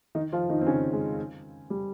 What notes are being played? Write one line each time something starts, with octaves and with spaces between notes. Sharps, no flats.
D#3 D#4
F3 F4
D#3 D#4
C4
C#3 C#4
G#3
G3